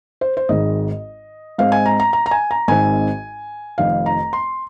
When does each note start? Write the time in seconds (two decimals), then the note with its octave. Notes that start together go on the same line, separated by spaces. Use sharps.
0.21 C5
0.37 C5
0.49 G#1 G#2 D#3 G#3 D#5
1.58 G#2 G#3 C4 F5
1.72 G#5
1.86 A#5
2.00 A#5
2.13 A#5
2.26 A#5
2.31 G#5
2.51 A#5
2.68 G#1 G#2 D#3 C4 G#5
3.78 F1 F2 D#3 F5
4.06 A#5
4.33 C6